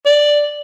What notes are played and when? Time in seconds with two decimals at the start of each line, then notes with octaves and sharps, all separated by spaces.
0.06 D5